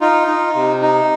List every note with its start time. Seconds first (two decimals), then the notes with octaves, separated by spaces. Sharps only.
0.01 D#4 F4
0.27 D#4
0.55 C3
0.82 D#4